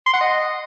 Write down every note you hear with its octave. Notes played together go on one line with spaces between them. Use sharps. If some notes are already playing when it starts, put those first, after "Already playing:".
C6
F#5
D#5